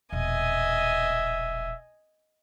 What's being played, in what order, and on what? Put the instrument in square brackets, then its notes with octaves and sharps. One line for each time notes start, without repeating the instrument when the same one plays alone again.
[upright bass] E1 A#1 [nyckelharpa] D#5 G#5 [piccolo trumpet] E5